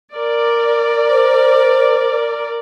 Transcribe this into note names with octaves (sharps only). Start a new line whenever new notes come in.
A#4 D5
C5